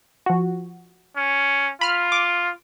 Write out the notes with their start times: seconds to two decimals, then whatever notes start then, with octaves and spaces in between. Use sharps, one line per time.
0.26 F3 F#4
1.17 C#4
1.81 F4 B5 F6
2.12 D6